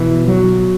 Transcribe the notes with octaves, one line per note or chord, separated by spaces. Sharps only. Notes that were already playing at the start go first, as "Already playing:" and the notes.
Already playing: B2 E3
F#3